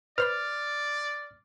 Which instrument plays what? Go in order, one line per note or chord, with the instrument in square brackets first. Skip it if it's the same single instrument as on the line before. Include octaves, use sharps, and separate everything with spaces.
[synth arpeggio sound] B4 C5 B5 [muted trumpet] D5 [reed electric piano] F6